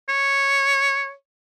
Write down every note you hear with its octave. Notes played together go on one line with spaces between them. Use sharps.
C#5